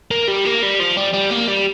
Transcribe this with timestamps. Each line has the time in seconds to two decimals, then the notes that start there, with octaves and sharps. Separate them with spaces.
0.11 A#3
0.28 G3
0.45 A#3
0.63 G3
0.80 F3
0.97 G3
1.14 G3
1.31 A#3
1.48 G3